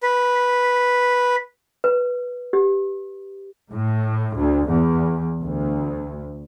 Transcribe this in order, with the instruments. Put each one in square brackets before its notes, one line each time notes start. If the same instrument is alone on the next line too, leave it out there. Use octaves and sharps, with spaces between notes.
[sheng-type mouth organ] B4
[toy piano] B4
G4
[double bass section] A2
D2
E2
D2